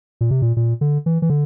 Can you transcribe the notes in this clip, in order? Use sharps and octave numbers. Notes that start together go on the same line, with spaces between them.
A#2
C3
A#2
A#2
D3
E3
E3
D3